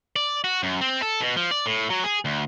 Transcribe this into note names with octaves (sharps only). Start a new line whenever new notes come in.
D5
F#4
F#2
C4
A4
B2
F3
D5
A2
F#3
G#4
D2